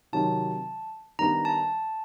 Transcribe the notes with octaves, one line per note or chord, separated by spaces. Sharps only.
C3 D#3 F#3 A5
D#3 G3 B3 D4 A#5
A5